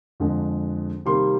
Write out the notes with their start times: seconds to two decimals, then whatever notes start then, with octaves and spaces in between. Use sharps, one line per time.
0.20 F2 D3 G#3
1.06 C3 D#3 G3 A#3 C6